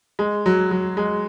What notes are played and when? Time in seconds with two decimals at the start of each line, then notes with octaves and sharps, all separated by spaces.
0.19 G#3
0.46 F#3
0.71 F#3
0.97 G#3